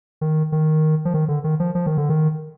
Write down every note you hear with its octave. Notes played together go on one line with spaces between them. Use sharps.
D#3
D#3
F3
D#3
D3
D#3
F3
F3
D#3
D3
D#3